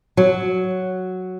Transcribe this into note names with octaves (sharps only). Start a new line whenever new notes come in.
F#3